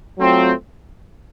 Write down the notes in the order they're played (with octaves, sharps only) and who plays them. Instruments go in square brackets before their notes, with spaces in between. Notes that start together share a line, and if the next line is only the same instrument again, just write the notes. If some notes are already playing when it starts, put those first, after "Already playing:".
[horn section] F#3 A3 C4 F4